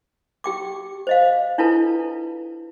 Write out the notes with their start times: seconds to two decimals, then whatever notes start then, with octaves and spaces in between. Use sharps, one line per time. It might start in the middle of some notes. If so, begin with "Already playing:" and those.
0.44 G4 G5 D6
1.07 C5 D#5 F5
1.58 D4 E4 F4 A4 B4 A5